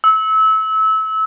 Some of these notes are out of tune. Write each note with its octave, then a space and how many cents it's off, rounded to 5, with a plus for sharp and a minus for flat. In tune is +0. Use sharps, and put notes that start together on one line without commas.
E6 -25